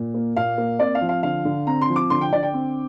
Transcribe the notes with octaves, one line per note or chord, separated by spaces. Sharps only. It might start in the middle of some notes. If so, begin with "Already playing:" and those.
Already playing: A#2
A#3
A#2 F5
A#3
C4 D5
F5
F3
F5
D3 F5
D3
C4 A#5
C6
F3
D6
D3 C6
G5
D3 D5
G5
C4